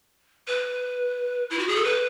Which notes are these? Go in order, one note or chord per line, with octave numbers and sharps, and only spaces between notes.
B4
E4
F#4
G#4
A4
B4